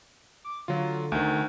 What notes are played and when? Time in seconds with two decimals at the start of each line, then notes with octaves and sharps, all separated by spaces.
0.44 D6
0.68 D3 F#3 F4
1.12 D2 D#3